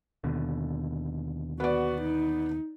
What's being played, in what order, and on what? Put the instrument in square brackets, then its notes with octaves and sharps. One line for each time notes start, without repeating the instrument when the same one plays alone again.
[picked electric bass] D#2 B2 D3
[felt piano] B3 D5 [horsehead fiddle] F#4
[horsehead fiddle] D#4